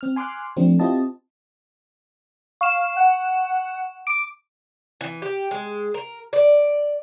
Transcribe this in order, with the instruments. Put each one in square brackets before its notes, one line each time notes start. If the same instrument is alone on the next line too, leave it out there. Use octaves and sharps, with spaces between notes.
[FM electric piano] C4 F6
G#5 C6 D6 F6 F#6
F3 A3 C4 D4
C4 E4 F4 G4 D#5 A5
[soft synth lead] F5 [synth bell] C#6 E7
[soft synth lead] F#5
[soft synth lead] D6 [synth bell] D7
[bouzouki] E3
G4
G#3
A#4
D5